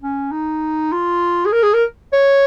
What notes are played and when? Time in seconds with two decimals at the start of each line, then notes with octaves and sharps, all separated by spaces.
0.02 C#4
0.32 D#4
0.92 F4
1.46 G#4
1.53 A#4
1.63 G#4
1.74 A#4
2.13 C#5